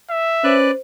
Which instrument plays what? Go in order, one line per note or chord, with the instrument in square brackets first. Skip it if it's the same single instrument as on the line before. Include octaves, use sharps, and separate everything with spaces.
[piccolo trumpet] E5
[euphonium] C#4 [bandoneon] B4 D5 F#6 [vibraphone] C5